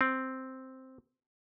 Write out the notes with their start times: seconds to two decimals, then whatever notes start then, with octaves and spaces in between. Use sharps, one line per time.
0.01 C4